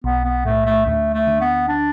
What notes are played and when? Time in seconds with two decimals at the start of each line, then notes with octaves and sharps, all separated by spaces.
0.04 B1 B3
0.24 B3
0.45 A2 A3
0.66 A3
0.86 D2 A3
1.14 A3
1.27 D3
1.41 B3
1.68 D4